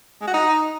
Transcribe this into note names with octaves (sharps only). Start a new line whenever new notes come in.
G#3
F#4
D#4